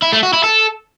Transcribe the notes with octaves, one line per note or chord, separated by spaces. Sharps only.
E4
A3
F#4
E4
A4